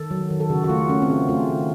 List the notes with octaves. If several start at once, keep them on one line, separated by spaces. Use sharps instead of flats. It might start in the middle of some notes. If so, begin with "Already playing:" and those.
Already playing: D#3 A4
F#3
D#3
A4
C#3 F#4
F#4
A3 F4
A3 C#4
C4
C#3
A3 F4
D#3